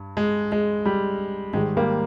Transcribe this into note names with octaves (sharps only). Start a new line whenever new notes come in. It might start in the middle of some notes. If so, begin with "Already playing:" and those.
Already playing: G2
G#3
G#3
G3
G#2 D#3 G3 G#3
G3 A#3